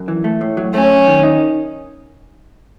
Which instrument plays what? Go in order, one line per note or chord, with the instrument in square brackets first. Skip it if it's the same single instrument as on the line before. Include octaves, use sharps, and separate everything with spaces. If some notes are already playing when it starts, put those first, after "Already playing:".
Already playing: [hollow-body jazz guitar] F#2
E3
A3
A2
F#3
[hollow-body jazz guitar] A3 [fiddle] C#4
[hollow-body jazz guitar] F#2
D#3
D#4